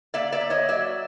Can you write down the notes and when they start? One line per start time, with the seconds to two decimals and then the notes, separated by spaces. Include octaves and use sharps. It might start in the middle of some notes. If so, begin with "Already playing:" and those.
0.14 A#3 D5 E5
0.32 D5 E5
0.41 A#3
0.50 C#5 D#5
0.69 F#3 D5 E5